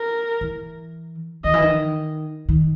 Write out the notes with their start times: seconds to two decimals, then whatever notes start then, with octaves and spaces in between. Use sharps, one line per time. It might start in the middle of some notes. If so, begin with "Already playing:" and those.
Already playing: A#4
0.41 E3
1.44 D#3 D#5
1.54 E3
1.62 D#3
2.49 D#3